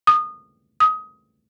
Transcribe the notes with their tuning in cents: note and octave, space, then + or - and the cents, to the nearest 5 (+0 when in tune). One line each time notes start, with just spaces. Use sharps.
D#6 -25
D#6 +20